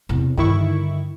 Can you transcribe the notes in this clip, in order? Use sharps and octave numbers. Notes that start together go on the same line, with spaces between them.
E2 C3
G2 D3 D#3 E4 C#6